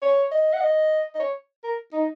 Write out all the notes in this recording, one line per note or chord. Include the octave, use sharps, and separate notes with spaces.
C#5
D#5
F#5
D#5
D#5
C#5
A#4
D#4